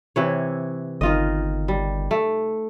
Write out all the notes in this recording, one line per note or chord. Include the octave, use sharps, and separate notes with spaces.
C3 E3 C#5
G1 D#3 F4 D#5
G3
A3